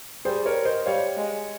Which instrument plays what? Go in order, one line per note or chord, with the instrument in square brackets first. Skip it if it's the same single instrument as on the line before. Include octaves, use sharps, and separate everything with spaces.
[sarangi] G3 [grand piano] G#4 C5
[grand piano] A#4 C#5
C5 D#5
[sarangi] G3 [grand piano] C#5 F5
[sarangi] G#3